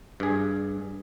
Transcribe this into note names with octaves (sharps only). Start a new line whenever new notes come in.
G2 G#4